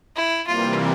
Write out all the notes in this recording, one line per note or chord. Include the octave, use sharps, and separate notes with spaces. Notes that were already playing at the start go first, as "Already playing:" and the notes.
E4
C3 E3 G3 A#3 F4